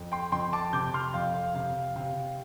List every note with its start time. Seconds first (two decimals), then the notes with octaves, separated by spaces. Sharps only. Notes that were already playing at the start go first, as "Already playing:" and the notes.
Already playing: F2
0.12 G5 C6
0.32 F2 G5 C6
0.53 A5 D6
0.73 C3 D6 G6
0.94 C6 F6
1.14 F2 F5
1.35 F5
1.55 C3 F5
1.96 C3 F5